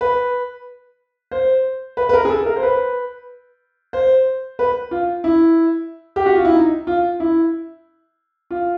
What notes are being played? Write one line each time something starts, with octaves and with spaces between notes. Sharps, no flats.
B4
C5
B4
B4
A#4
G#4
A4
A#4
C5
B4
C5
B4
F4
E4
G4
F#4
F4
E4
D#4
F4
E4
F4